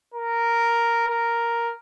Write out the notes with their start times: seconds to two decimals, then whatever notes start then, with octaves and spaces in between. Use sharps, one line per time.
0.14 A#4
1.07 A#4